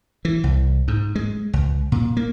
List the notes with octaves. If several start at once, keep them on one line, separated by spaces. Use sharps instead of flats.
E3
C2
G#2
G#3
C#2
A#2
A#3